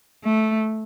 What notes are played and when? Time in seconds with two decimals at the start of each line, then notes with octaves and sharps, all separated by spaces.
0.24 A3